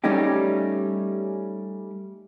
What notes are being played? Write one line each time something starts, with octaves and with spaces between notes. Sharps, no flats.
G3 A3 C#4 D#4 G4